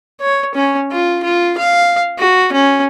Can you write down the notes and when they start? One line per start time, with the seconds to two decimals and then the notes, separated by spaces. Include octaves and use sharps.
0.21 C#5
0.55 C#4
0.91 F4
1.23 F4
1.58 F5
2.18 F#4
2.53 C#4